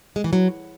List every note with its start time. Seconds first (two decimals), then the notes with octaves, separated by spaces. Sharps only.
0.16 G#3
0.24 E3
0.33 F#3